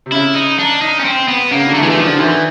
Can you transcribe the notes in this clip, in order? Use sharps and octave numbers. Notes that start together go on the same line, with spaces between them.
C3
C#3 E4
D#4
D4
D#4
C#4
C4
B3
C#3 A#3
D3
A3
E3 G#3
A3
D#3 F3
D3
D#3 E3